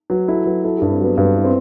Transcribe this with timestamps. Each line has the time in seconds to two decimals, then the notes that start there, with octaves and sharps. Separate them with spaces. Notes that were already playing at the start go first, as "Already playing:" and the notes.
0.10 F#3 B4
0.28 E4 A4
0.46 F#3 B4
0.64 E4 A4
0.78 G2 G4
0.90 C4
1.00 F#3 B3
1.17 G2 B3
1.36 E4
1.44 C4